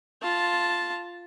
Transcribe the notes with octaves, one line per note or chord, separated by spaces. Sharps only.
F4 A5